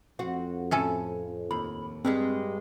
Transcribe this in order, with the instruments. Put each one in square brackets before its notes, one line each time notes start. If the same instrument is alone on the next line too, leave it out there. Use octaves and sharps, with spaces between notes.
[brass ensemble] F2 [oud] C4 F#4
[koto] A2 C#4 A4
[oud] D#2 [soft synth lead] B5
[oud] G2 G3 G#3 [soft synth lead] C4